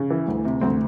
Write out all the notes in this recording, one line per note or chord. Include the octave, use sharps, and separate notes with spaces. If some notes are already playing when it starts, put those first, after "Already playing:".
Already playing: C#3
E3
D2
C3
D2 C4